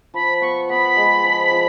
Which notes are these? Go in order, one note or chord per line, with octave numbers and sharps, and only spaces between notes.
F3 B5
B3 C#6
B3 B5
G#3
F3
F3